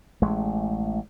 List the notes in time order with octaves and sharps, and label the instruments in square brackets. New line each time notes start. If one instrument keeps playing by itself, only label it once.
[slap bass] A1 G#3 A3